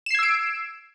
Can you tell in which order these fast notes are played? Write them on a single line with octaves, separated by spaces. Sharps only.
E7 C7 G#6 E6 D7